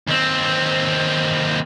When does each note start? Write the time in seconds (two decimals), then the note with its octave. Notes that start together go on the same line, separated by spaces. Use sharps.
0.08 D#2 C4